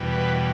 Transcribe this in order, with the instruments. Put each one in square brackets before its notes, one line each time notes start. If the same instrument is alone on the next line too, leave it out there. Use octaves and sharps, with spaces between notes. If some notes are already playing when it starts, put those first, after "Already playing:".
Already playing: [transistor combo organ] E2 B2 G3
B4